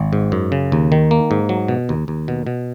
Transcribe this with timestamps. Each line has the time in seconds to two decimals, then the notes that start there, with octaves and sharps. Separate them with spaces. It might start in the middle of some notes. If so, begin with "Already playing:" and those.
Already playing: G#1
0.13 G#2
0.32 F#2
0.52 C#3
0.72 D#2
0.92 D#3
1.11 A#3
1.31 G#2
1.49 F#3
1.68 B2
1.89 D#2
2.08 D#2
2.28 B2
2.47 B2